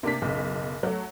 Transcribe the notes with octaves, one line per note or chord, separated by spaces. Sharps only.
C3 A#3 D4 B6
F#1 B1
F#3 A3